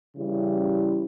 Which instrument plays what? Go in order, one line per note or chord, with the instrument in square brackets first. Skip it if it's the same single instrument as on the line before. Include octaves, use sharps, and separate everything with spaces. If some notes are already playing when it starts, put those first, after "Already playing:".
[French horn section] C#3 E3 G3 C#4 E4